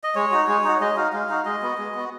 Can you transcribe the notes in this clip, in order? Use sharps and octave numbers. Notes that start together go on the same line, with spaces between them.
D#5
G#3 C#5
D#4 F#4
G#3
D#4 F#4
G#3 D#5
D#4 F#4 F5
G#3 F5
D#4 F#4
G#3 D#5
B3 F#4
G#3
B3 F#4